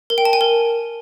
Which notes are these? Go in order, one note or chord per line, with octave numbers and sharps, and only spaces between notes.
A#4
G5
A5
G#5
A#4